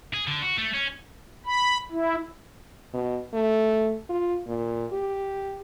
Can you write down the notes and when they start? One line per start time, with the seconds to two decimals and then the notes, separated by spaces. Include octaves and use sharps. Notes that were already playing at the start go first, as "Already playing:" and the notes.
0.14 G#4
0.27 D3
0.43 F#4
0.58 A3
0.74 C#4
1.46 B5
1.92 E4
2.94 B2
3.34 A3
4.09 F4
4.47 A#2
4.92 G4